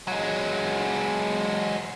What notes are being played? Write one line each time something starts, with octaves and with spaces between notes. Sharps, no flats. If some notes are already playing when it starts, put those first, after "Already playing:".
F#3 G#3